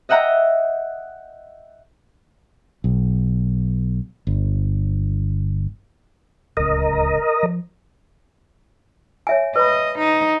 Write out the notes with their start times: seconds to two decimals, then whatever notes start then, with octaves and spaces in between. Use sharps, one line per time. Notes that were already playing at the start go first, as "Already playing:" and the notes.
0.09 D#5 E5 F#5 G5 A#5
2.84 B1
4.27 G1
6.57 D1 C#2 A#4 D#5
7.43 F3
9.27 C#5 E5 G#5
9.56 B4 D#5 B5
9.98 D#4